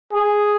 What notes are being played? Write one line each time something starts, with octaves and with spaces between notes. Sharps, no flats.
G#4